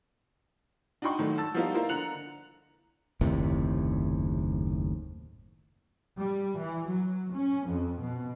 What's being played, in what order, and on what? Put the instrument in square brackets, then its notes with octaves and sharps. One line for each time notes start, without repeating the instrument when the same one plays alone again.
[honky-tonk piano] D4 D#4 F#4 G5 C6 C#6
A2 D#3 F#3 A3
A5 E6 A6
F3 G3 A#3 B3 D#4 F4
A#3 E4 F4 A#4 C5
D3 A#5 F#6 C#7 F7 F#7
[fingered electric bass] F#1 D#2 A2 C3
[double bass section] G3
E3
F#3
C#4
F2
B2